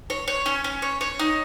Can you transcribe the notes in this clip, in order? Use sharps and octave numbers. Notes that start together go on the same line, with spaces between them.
C#5
C#5
C#4
C#4
C#5
C#5
D#4